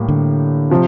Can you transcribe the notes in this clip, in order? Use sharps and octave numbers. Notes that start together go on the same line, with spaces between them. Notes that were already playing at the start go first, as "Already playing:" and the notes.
Already playing: A2 G3 A#3
D3
C3 F3